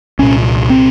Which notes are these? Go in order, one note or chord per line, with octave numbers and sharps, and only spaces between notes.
C2 A#2 C#4
C4